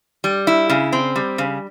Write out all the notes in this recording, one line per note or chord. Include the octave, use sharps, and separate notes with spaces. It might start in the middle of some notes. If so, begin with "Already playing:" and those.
G3
E4
C#3
C4
G3
C#3